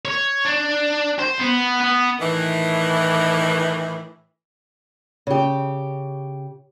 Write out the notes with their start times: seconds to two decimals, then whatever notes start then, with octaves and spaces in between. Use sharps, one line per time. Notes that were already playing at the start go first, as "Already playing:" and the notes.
0.05 C#5
0.45 D4
1.19 C5
1.39 B3
1.81 B3
2.20 A2 D#3 E3
5.27 C#3 G4